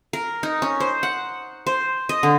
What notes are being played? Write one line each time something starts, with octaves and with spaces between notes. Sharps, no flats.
A#4
D#4
C#4
C5
F#5
C5
D#5
D3